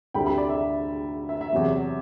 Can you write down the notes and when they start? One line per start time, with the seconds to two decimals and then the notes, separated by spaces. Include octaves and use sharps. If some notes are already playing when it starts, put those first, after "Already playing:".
0.14 D2 D3 G3 C4 E4 G5 B5
0.26 G5 B5
0.38 D5
0.49 E5
1.29 E5
1.41 E5
1.53 E2 C3 F#3